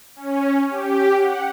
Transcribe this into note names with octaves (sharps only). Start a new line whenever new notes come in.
C#4
G4
F#5